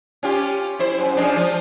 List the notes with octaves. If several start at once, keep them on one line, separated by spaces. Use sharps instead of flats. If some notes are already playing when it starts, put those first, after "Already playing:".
C#4 F4 G4
E4 C5
F#2
F3 G#3 D4
F3